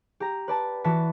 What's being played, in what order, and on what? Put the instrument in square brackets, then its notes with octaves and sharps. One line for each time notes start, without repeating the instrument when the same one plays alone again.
[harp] G4 A#5
B4 D5 A5
E3 F#4 A5 B6